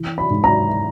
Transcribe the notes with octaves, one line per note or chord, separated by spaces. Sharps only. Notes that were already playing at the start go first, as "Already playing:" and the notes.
Already playing: E3
B5
G#2
A#5